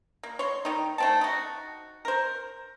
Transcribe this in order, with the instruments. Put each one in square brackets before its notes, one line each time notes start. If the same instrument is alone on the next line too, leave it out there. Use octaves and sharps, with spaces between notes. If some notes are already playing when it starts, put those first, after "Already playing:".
[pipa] A#3
C#5 C6
D#3 D#4
A3 C4 A5
D#4 F#4
A#4 C5